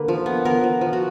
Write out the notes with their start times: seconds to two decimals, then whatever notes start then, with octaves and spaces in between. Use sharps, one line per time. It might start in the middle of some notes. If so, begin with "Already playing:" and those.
Already playing: D3 A#3 B4
0.08 F3
0.26 B3
0.45 B3 A#4
0.64 F3
0.81 F3
0.93 F#4